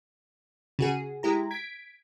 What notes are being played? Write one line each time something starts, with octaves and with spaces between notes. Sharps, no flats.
C#3 F#4 G#4
G#3 E4 G4 A#5
G#6 B6 D7